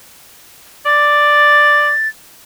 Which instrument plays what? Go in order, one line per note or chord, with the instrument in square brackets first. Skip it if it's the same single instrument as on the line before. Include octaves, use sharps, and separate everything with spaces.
[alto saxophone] D5 [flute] A6